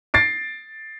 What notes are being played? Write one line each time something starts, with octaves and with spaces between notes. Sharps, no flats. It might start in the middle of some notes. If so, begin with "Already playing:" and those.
A6 C7 D7